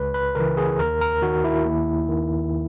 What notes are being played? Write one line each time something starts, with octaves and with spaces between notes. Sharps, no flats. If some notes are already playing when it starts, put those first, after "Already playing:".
Already playing: C#2 B4
B4
C#3 E3 A#4
G#4
D#2 A#4
A#4
D#3 F#4
E4
D#2
D#3